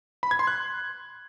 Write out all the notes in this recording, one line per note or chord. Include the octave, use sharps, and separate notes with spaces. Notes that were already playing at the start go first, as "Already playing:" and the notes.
B5
G#6
C6
F#6